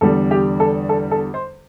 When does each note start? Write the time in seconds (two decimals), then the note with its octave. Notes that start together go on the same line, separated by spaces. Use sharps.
0.01 E2 D3 G3 A4
0.31 G4
0.60 A4
0.89 A4
1.11 A4
1.34 C5